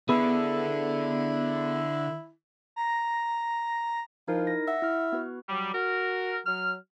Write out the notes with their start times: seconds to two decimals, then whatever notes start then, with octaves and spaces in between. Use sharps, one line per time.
0.09 D3 B3 E4 G#4 A4 B5
2.76 A#5
4.28 F3 D#4 E4 A#4
4.47 A#6
4.68 E5 F#5
4.82 E4 F6
5.12 B3 F#4 B4
5.49 F#3 G3
5.73 F#4 A#4
6.46 F#3 F6